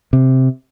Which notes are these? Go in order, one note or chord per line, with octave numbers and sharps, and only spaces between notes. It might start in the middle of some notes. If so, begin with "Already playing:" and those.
C3